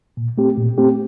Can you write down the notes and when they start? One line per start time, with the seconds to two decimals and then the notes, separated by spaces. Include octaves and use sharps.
0.17 A#2
0.38 A3 C4 G4
0.57 A#2
0.78 A3 C4 G4